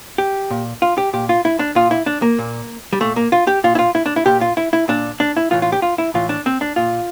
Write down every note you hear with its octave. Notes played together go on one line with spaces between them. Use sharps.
G4
A#2
F4
G4
A#2 G4
F4
E4
D4
A#2 F4
E4
D4
A#3
A#2
G3
A#2 A3
A#3
F4
G4
A#2 F4
E4
F4
E4
D4
E4
A#2 G4
F4
E4
E4
A#2 D4
D4
E4
A2 E3 F4
F4
G4
F4
E4
A2 E3 F4
D4
C4
D4
A#2 F4